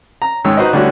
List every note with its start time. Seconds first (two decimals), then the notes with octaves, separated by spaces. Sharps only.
0.22 A#5
0.45 G#2 D#3 G#3 C#5 E6
0.57 D#4 F#4 B4 C5 D#5
0.73 D3 G3 A3 C#4 E4 F#4